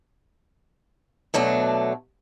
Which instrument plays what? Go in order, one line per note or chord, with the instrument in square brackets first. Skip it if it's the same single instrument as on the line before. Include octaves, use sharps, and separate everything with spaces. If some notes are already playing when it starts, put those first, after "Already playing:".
[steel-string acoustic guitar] B2 F#3 A3 D4